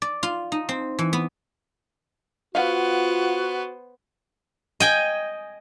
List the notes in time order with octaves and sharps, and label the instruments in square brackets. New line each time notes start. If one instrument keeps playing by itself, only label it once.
[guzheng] D5
F4
D#4
C4
E3
B3
[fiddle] B3 C5 [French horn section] F4 [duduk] F#4 [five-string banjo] F5 F#5
[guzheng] D#5 G5 G#5